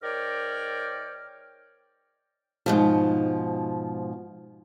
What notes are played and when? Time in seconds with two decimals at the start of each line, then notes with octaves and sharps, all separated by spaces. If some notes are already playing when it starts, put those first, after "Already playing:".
0.02 G#2 A#4 C#5 D5 G5 F6
2.66 G#2 B2 F3